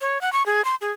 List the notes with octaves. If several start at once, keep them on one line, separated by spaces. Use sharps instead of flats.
C#5
F#5
C#6
G#4
C6
G#4